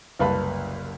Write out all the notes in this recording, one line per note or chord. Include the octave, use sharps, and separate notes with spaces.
F#1 C2 B4 F5 A5 B5